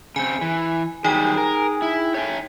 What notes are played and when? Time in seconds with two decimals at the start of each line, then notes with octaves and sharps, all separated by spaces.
0.16 C#3 C4 G#5
0.41 E3
1.04 D#3 F#3 G3 D#4 G#4 G5
1.38 A#4
1.82 E4
2.14 C#5 E5 G#5